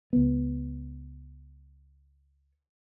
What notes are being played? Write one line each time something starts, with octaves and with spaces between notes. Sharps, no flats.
C#2 B3